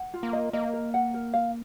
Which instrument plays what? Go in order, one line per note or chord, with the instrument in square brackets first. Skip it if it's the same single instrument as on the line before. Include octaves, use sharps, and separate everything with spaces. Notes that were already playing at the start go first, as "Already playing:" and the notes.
Already playing: [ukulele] F#5
F4
[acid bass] A#3
[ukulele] D#5
[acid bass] A#3 [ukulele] D#5
[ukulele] A#4
F#5
A#4
F5